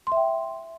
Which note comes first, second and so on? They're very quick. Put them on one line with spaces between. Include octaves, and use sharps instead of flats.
C6 E5 G5